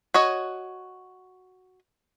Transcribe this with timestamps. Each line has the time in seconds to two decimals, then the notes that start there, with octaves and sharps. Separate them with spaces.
0.14 F#4 C#5 D#5